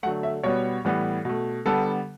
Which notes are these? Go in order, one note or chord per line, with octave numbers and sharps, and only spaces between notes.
D3 F#3 A3 F#5
E5
B2 G3 B3 C#5
A2 E3 G3 B3
B2 A3
D3 G3 B3 A4